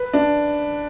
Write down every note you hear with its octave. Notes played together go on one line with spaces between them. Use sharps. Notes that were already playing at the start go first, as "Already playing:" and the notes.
Already playing: B4
D4